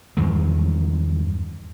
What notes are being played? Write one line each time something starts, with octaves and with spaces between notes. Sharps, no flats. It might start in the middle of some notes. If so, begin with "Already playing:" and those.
E2 G2 D#3 G#3